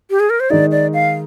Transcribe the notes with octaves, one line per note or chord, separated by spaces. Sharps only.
G4
G#4
A#4
C5
D#3 G#3 D#4 D5
D5
F5